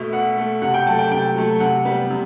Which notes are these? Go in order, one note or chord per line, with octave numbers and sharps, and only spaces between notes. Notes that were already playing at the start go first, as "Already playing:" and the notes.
Already playing: B2 A3 E5
B2 F#5
A3
C3 F#5
G5
F#3 A3 A5
G5
C3 G5
F#3 A3
C3 F#5
G3 B3
C3